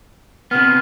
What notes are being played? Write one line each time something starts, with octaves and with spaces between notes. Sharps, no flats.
C3 B3 F6